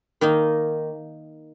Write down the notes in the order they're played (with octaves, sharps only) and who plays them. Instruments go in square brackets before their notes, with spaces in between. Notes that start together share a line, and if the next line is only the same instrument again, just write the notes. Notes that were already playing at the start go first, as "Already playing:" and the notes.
[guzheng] D#3 A#3 D#4